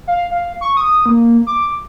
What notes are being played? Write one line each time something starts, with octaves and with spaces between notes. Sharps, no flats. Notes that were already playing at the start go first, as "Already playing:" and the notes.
F5
F5
C#6
D#6
A#3
D6